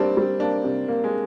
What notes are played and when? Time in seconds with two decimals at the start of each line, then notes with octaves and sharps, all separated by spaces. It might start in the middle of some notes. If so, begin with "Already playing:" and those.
Already playing: G3 A#3 C4 D4
0.17 G3
0.40 A#3 D4
0.64 C3
0.88 A#3
1.04 G#3